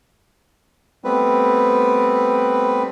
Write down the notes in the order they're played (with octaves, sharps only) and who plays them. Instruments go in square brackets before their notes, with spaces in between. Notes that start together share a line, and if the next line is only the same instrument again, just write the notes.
[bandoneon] G3 A3 B3 C4 B4